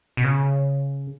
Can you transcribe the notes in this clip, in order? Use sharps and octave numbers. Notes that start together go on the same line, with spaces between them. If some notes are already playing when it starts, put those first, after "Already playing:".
B2
C#3